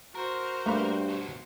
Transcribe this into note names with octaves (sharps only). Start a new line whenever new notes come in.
F#4 A#4 C5
G2 A3 A#3 B4
B2 F#3